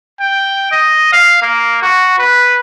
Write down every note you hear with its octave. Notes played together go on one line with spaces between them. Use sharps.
G5
D#5
F5
A#3
F#4
B4